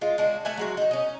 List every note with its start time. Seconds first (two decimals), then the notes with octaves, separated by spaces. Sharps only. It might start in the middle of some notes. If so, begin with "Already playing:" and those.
0.01 G#3 F4
0.18 G#3 D4 F#4
0.45 A3 E5 F#5 G#5
0.57 F#3 G#3 F#4
0.77 D#4 F#4
0.91 C#4 D#4